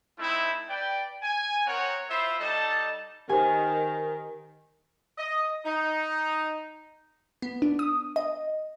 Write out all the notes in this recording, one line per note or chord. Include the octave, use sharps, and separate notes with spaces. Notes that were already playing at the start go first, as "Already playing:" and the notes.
A3 C4 D#4 E4
B4 D5 G5
G#5
C4 A#4 C#5 F#5
E4 F4 C5 E5 B5
G3 D#4 A4 D#5 A5
D#3 G4 C5 G#5
D#5
D#4
B3
D4
D#6
D#5